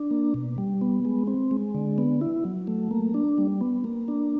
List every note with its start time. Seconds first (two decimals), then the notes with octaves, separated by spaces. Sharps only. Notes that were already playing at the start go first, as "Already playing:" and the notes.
Already playing: D4
0.11 A#3
0.34 B2
0.58 G3
0.81 B3
1.05 G#3
1.27 C4
1.51 G#3
1.75 D3
1.98 B3
2.21 E4
2.45 F#3
2.67 A3
2.91 A#3
3.14 D4
3.38 G3
3.61 B3
3.84 A#3
4.08 D4